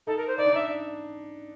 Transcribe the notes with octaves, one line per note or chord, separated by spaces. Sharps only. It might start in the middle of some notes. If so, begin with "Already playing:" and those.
D#4 A4
A#4
C5
D#4 D5
D4
D#4 E5